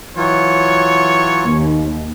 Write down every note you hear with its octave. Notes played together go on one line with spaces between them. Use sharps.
E3 F#3 F4 C#5
D#2